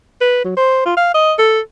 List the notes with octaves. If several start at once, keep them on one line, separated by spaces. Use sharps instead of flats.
B4
F#3
C5
F4
F5
D#5
A4